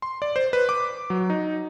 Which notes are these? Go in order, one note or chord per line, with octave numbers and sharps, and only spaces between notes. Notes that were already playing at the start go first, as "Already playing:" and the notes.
C6
D5
C5
B4
D6
F#3
D#4